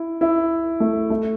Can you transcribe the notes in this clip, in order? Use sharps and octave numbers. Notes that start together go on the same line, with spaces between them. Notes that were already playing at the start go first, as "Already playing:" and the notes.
Already playing: E4
E4
A3
A3